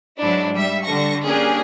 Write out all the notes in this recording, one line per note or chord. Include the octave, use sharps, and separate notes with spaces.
G#2 F#3 D4 E4
G3 E5
D3 G3 A4 C#6 A#6
A#3 C#4 D4 G4 G#4 A#4